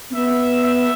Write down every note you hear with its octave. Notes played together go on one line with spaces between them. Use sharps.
C4
B3 E5
E5